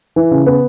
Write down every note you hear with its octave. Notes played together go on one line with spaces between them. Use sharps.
E3
C#3
B3